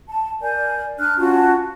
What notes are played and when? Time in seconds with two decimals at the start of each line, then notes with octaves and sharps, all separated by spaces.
0.08 A5
0.42 A#4 D5 G#5 G6
0.98 D4 F6 F#6
1.18 C#4 F4 F#4 A5